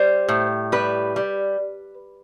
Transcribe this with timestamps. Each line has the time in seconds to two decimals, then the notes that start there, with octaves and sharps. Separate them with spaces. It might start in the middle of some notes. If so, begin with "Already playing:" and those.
Already playing: G3 C5
0.28 A2
0.72 G3 B4
1.16 G3